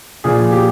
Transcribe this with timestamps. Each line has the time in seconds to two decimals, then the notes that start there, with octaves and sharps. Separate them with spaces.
0.24 A#2 F3 G#4
0.52 G4